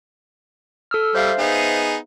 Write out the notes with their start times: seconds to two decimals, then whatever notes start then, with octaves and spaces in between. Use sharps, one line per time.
0.91 A4 E6 F6
1.15 G3 C5 E5 F5
1.39 B3 D#4 G#4